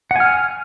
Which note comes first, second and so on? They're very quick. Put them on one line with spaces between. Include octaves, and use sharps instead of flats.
F#5 G#5 F6